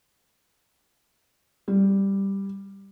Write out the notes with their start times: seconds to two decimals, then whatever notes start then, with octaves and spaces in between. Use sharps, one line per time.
1.68 G3